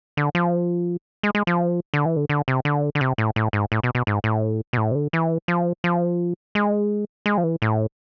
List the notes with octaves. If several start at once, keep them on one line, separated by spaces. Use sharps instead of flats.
D3
F3
G#3
G#3
F3
D3
E3
D3
D3
C3
D3
D3
C3
A2
A2
G#2
A2
B2
B2
G#2
A2
B2
A2
C3
D3
E3
F3
F3
G#3
G#3
F3
E3
A2